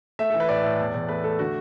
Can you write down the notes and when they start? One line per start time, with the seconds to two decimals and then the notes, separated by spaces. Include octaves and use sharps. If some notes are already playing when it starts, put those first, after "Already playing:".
0.19 A3 E5
0.30 E3 A4
0.40 B4
0.49 A2 D5
0.63 A2
0.79 E2
0.94 E2
1.08 A3 B4
1.24 A3 A4
1.39 D3 F#4